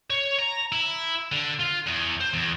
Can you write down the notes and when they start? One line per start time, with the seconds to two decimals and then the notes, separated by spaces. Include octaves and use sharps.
0.10 C#5
0.38 A#5
0.72 E4
1.32 D3
1.60 F4
1.86 E2
2.20 C5
2.34 E2